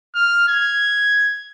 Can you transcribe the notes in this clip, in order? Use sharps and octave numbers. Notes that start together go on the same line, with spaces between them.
F6
G#6